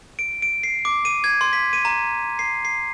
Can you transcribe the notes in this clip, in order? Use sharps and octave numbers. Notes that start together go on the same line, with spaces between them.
D7
D7
C7
D6
D#7
G#6
C6
B6
D#7
A#5
C7
C7